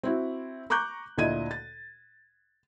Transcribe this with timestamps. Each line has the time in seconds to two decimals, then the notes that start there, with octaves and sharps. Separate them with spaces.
0.03 C4 E4 F#4
0.70 A#5 C#6 D6 F#6 G6
1.17 D2 A#2 E4 D#5 G#6 D#7
1.51 A6